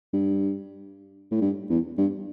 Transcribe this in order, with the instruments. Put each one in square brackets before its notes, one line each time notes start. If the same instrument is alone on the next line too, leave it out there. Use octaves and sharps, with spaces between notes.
[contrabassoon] G2
A2
G2
E2
G2